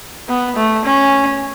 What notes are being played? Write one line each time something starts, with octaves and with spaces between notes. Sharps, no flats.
B3
A3
C#4